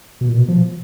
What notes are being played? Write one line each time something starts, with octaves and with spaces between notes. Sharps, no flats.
B2
A#2
B2
F3